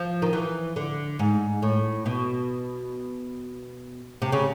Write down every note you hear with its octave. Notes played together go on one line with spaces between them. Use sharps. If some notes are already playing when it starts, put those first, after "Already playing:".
Already playing: F3
D#3
E3
D3
G#2
A2
B2
C3
C#3